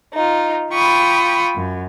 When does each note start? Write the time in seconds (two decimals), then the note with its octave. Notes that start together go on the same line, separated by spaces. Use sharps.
0.14 D#4 F4
0.72 F4 G5 B5 C#6 D#6
1.54 F#2